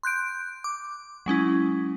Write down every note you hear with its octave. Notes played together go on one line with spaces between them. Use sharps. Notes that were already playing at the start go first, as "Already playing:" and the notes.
C6 F#6 G6 D7
D6
F#3 G#3 C#4 E4